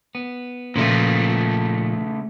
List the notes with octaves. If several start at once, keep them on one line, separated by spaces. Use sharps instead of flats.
B3
A#2 C#3 F3 A3